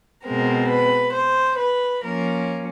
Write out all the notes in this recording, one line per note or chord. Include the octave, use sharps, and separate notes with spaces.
B2 G#3 C4 A#4
B4
C5
B4
F3 A#3 C#4 A#4